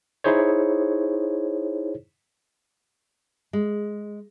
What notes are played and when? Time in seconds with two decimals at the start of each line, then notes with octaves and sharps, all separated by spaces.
0.24 D#4 E4 G#4 C5 C#5
3.53 G#3